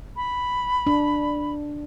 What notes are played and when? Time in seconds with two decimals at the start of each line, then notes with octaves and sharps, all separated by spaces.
0.16 B5
0.87 D4